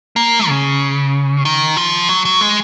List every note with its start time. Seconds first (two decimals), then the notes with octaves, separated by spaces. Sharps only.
0.16 A#3
0.48 C#3
1.45 D#3
1.77 F3
2.09 F#3
2.25 F#3
2.41 G#3